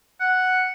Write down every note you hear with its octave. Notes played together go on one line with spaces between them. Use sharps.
F#5